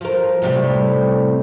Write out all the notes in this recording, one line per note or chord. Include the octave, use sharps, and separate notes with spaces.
F3 A#4
A2 C3 G3